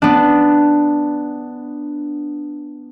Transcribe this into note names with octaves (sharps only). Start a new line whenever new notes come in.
B3 D4